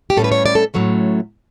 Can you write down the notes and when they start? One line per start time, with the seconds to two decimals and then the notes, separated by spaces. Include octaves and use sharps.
0.10 G4
0.17 A2 G3 C#4 A4
0.24 B4
0.32 C#5
0.46 D5
0.55 A4
0.74 A2 F#3 A3 C#4